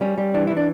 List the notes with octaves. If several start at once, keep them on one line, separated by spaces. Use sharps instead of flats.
G3 C#4
G3
E3 D4
E3 E4
D4